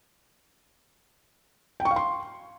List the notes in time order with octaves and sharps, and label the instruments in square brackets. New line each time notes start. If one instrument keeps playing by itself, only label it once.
[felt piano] G5
C#6
F5
C6